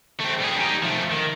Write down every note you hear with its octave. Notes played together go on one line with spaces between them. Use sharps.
A3 C4
G3 G#4
D#4 G4
F3 A3
D#3